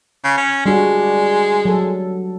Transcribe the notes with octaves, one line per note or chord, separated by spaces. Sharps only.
C#3
C#4
G3 G#3 D4 F#4
F#3 A4